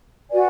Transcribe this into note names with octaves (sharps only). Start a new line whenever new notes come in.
F#4 B4 D5 G#5